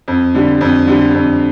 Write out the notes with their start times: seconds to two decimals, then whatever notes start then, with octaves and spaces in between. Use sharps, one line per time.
0.08 F2
0.34 D3 G3
0.61 F2
0.87 D3 G3
1.14 F2